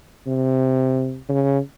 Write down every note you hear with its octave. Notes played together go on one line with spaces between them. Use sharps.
C3
C#3